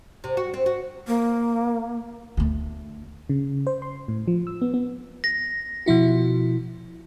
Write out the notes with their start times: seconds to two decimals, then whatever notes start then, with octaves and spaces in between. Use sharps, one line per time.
0.24 C3
0.37 F#4
0.54 C4
0.66 F#4
1.07 A#3
2.37 D2 A3
3.30 C#3
3.67 C5
3.82 C6
4.08 A2
4.28 F3
4.47 E6
4.62 B3
4.74 B3
5.24 A#6
5.86 B2 F3 E4 F#4